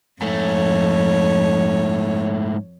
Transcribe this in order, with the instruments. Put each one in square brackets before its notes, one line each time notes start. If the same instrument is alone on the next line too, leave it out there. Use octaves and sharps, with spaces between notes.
[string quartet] F2 C#5 [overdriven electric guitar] G#2 A3